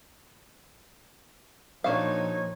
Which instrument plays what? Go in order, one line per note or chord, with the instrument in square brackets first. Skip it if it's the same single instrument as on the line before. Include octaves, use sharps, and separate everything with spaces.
[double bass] A#2 F3 [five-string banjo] D4 F#4 F5 [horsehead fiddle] D#4 C#5